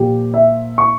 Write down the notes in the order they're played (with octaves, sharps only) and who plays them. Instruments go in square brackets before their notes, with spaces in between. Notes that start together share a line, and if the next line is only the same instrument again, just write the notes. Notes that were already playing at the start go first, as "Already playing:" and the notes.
Already playing: [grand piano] A#2 F3 G4
E5
C#6